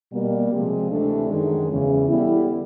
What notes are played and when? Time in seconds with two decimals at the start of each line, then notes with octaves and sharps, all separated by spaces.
0.12 B2 G3 A#3
0.51 C3 F3 G#3
0.90 D2 C3 E3 A3 D4
1.29 F#2 D#3 G#3
1.68 E2 C#3 E3
2.08 D3 G3 B3 E4